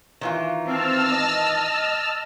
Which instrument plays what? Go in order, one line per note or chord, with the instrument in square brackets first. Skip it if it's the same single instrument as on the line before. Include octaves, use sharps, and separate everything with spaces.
[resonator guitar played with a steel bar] D#3 E3 F4
[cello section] C4 [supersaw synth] A5 E6 F6
[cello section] D#5